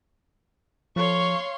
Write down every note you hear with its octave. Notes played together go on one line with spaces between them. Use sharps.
F3 A4 C#5 F5 C6 C#6